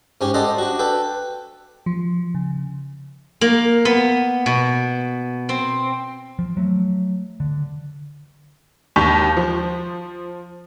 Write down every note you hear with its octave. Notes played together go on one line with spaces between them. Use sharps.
G#2 C#4 G4 C#5
G4 A4 C5 D5 D#5 F#5
D4 F#4
A4 B4 G5
F3
C#3
A#3
B3
B2
C4
F3
F#3 A3
D3
D#2 A5 C#6 G6 B6 F7
F3